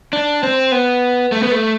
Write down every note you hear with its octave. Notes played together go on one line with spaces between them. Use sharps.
D4
C4
B3
A3
B3
A3